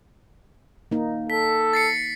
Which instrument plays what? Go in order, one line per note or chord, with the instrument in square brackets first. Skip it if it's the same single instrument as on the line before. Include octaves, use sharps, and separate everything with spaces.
[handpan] A#3 D#4
[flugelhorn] A4 [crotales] B6
[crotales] A6 C7 C#7